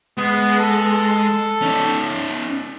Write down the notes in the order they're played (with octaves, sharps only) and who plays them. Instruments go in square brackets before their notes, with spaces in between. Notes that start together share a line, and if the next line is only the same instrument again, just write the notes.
[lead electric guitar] G#3 [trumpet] B3
[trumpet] A4
[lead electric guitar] C#4 D#4